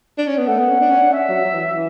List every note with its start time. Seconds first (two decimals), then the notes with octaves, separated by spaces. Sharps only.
0.18 D4
0.27 C#4
0.37 B3
0.48 A3 F#5
0.59 B3
0.69 C#4
0.80 D4
0.91 C#4
1.02 D4
1.13 C#4 E5
1.29 F#3
1.45 F#3
1.54 E3
1.74 E3